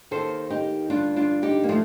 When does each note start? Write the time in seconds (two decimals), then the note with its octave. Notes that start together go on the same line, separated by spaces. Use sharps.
0.11 D#2 D#3 A4 C5
0.50 D#4 G4
0.90 G2 D3 F3 D4 F4
1.16 D4 F4
1.42 D#4 G4
1.63 A#3
1.69 D3 F3 A3